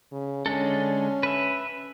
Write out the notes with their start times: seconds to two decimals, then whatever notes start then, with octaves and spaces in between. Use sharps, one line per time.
0.12 C#3
0.46 D3 G#3 C#4 A4
1.23 B4 E5